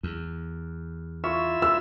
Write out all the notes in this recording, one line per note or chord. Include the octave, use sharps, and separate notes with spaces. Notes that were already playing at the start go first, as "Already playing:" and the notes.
E2
E4 F4 E5 C#6
E6